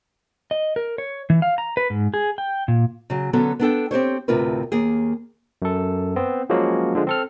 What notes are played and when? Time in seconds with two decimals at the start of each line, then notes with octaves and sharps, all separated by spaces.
0.51 D#5
0.76 A#4
0.98 C#5
1.30 E3
1.42 F5
1.58 A#5
1.77 B4
1.90 G#2
2.14 G#4
2.38 G5
2.68 A#2
3.10 C#3 F#3
3.33 D3 F#3 B3 C#4 F#4 A4
3.60 B3 D4 A4 G5
3.91 C4 G4 C5 C#5
4.28 D2 A2 C3 F4 A#4 B4
4.72 D#2 A#3 G#4
5.62 F#2 A4
6.16 B3 C4
6.50 F3 F#3 G#3 A#3 C#4 F#4
6.95 D3 F3 G#3
7.07 C4 A4 F6